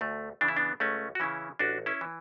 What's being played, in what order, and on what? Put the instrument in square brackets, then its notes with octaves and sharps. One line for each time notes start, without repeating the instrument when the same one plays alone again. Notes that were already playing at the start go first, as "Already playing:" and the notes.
[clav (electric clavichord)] D2 A3
C#3 E3 D4
E4
B3 D4
C#2 A3 C#4
F#4
C#3 E3 C#4 E4
A1 D4 F#4
C#4 E4
E3